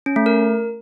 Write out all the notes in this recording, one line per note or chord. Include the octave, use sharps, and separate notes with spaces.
C#4
A3
A#4